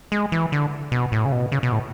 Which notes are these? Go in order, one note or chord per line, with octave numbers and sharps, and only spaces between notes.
G#3
E3
D3
B2
A2
C#3
B2
C#3
B2
A2